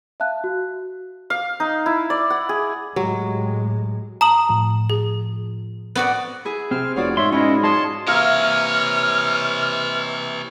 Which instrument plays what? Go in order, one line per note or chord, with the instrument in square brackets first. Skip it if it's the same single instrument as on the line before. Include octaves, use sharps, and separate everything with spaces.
[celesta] E5 F5 A5 F#6
F#4
[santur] F5
D#4
E4
D5
F#5
G#4
[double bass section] A2 G#3 [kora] F#3 [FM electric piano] G4
[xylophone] A5 D#6 F#7 [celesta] A#5
[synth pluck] A2 F3
[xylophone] G#4
[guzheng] B3 F#4 D5 [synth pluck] C4
[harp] E4 G#4
[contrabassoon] C3 [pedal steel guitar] C4 [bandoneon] F6
[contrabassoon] F1 [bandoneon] B3 C#5 [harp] F4 F#4 D5
[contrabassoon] G#2 [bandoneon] C#5 E5 [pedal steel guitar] C6
[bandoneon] G#3 E4 [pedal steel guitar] C#4 D#5 [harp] F4
[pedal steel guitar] G#3 C#5 D#6 [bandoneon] A5 C6
[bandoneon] C3 E3 [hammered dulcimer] A#3 A#4 E5 [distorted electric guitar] C#5 D#5 [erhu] F6